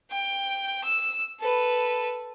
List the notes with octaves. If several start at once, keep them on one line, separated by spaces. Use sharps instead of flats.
G5
E6
A4 B4